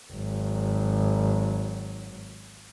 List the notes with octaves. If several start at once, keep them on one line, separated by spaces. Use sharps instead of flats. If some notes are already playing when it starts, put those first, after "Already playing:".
G#1 F#3